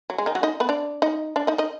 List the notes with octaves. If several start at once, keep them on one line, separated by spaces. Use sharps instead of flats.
F#3
G#3
D#3 D#4
F#3 F#4
D#4 D#5
B3 B4
D4 D5
D#4 D#5
D4 D5
D#4 D#5
D#4 D#5